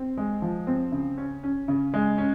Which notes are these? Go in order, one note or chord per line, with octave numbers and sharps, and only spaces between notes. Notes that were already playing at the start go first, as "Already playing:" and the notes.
Already playing: C4
G#3
F3
C4
C#3
C#4
C#4
C#3
G#3
C#4